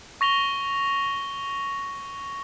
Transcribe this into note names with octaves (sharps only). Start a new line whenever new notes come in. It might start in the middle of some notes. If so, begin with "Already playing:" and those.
C#6 A#6 F7 G7